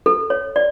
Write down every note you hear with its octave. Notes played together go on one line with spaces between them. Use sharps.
A4
C#5
D5